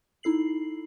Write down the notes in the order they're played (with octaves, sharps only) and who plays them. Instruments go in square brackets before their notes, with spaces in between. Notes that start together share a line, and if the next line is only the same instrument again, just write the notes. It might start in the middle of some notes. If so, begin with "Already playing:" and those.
[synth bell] D#4 E4 A4 C7 F#7